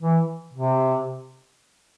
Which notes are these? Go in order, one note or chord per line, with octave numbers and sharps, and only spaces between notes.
E3
C3